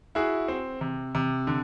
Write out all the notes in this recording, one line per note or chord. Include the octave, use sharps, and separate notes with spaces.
E4 F#4 G#4
C4
C3
C3
D3